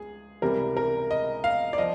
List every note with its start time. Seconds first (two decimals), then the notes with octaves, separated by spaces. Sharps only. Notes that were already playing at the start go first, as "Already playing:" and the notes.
Already playing: C#2 G#4
0.42 C#2 C3 E3 G3 A#4
0.77 A#4
1.11 D#5
1.44 F5
1.73 D5
1.78 F3 D#5